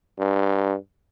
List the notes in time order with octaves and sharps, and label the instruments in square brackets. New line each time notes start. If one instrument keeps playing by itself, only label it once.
[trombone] G2